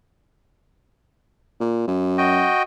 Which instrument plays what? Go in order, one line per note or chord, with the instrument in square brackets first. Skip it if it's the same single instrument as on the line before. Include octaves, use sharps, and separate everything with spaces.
[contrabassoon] A#2
F#2
[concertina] F#4 D#5 G5